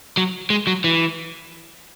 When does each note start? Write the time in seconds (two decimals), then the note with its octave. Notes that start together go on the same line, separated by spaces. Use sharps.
0.17 F#3
0.50 G#3
0.67 F#3
0.84 E3